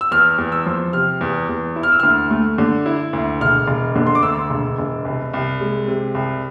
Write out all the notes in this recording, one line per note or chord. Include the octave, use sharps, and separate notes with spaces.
E6
E2 F6
E2
E6
F3
C3 F6
E2
E2
E4
F6
E6
D2 F6
A3
D3
E4
D2
E1 F6
E1
D3
C6
D6
D2 E6
E1
E1
C2
C2
G#3
C3
C2